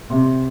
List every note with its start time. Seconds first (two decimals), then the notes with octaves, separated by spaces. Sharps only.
0.10 C3